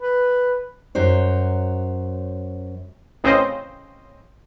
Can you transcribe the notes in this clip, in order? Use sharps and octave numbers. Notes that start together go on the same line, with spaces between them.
B4
F#2 F#3 C5 C#5
A1 C#3 C4 C#4 C5 D#5